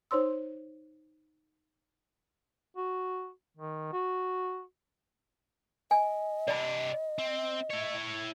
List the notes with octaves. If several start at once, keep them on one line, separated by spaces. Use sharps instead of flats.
D#4 C5 C#5 C6 E6
F#4
D#3
F#4
D#5 G#5
C3 D4 D5 B5
C4
E4 C#5